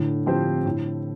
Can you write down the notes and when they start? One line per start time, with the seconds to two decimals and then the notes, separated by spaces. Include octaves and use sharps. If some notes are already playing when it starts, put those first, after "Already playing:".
Already playing: A2 D3
0.26 F3 C4 G4 C5
0.66 A2